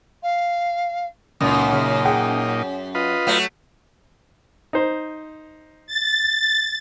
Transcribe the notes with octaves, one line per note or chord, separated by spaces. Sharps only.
F5
C#2 F#2 A#2 D#4
C#3
G#4 F#5 G5
F4 B4 D#5
F#3 A3
D#4 C5
A6